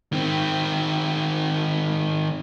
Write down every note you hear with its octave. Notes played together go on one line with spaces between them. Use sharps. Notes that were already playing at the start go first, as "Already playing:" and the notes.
D#3 C4